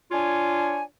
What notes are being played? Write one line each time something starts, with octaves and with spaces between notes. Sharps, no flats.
D4 F4 C#5 G#5